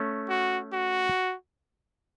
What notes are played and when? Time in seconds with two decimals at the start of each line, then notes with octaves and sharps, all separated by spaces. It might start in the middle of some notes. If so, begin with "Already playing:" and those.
Already playing: A3 C#4
0.29 F#4
0.73 F#4